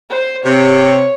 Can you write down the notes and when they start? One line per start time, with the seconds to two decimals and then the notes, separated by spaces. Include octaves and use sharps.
0.10 C5
0.45 C3 C#5